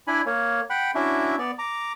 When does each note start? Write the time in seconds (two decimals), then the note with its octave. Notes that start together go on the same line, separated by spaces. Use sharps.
0.07 D4 E4 G#5 B5
0.26 A#3 C#5
0.70 F#5 G5 B5 F#6
0.95 C#4 D4 E4 F#4 E5
1.38 B3 D5
1.59 A#5 D6